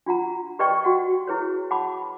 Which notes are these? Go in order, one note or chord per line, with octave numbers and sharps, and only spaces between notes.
D4 F4 F#5 A#5
G4 B4 D5 D#5 G5 C#6
F#4 F#5
E4 G#4 B4 C#5
F#5 A5 B5 D6